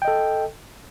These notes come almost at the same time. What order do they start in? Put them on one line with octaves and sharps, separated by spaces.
G5 D#5 A4